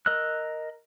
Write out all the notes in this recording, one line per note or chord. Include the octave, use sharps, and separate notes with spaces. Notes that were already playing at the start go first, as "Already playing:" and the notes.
A#4 D#5 E6 F#6